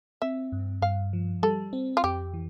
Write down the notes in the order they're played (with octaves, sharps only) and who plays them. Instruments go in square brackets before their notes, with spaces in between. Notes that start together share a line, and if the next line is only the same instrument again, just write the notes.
[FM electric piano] C4 [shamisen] E5
[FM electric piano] G2
[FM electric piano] G2 [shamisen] F5
[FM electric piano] F3
[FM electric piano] G3 [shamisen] A4
[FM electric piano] C4
[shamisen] F4
[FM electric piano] F2 [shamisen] G4
[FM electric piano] E3